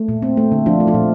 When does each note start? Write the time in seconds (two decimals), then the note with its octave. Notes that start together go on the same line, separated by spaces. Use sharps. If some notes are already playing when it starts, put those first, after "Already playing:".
Already playing: A3
0.08 A#2
0.22 C4
0.37 A3
0.52 D3
0.66 F3 D4 F4
0.80 A3
0.87 F3 F4
0.94 A#2